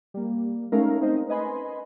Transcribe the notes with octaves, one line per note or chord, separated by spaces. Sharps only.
G3 A#3
G#3 A3 C#4 D#4 A#4 F5
C4 D#4 A#4 C5 D#5
B4 D#5 G#5 B5 C6